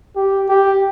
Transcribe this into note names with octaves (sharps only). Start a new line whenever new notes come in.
G4
G4